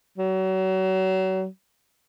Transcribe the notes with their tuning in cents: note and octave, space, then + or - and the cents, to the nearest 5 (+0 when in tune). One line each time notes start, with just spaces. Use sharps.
F#3 +35